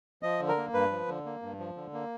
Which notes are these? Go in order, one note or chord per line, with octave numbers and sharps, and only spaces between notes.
F3 D#5
D3
A#4
A#3
G2 B4
F3
D3
A#3
G2
F3
D3
A#3